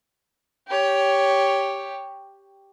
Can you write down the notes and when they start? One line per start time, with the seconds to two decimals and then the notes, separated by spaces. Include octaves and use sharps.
0.68 G4 C#5